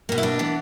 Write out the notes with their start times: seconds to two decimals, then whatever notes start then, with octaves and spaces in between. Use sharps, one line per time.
0.09 B2 A#3
0.18 E4
0.23 D4
0.39 E3 B3